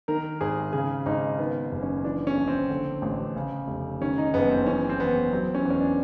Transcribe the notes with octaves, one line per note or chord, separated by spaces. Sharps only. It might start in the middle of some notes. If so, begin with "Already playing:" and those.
D#3 A#4
G#1 G#4
C#3 G#4
G#1 D#4
D#3 B3
F#1
C#4
E3 D4
C#4
A#1
C4
D3
A1
C#3
F1
D#3 C#4
D#4
F#1 B3
C4
E3 C#4
C4
E2 B3
F#3 C4
C#4
E2
C#4
D4